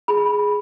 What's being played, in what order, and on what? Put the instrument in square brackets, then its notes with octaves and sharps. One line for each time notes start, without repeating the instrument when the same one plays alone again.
[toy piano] G#4 B5